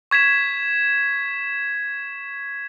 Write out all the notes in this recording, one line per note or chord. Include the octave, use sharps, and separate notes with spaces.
C#6 G#6 B6 E7